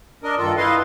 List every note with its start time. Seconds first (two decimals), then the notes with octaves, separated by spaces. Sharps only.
0.23 D4 A#4 D#5
0.38 G2 D#3 F4 A4
0.57 E4 B4 D#5 F5 C6